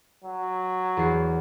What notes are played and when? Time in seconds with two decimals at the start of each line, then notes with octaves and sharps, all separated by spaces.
0.24 F#3
0.97 E2 C7